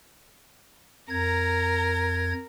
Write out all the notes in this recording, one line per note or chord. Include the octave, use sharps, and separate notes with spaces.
F2 A#4 A#5 G#6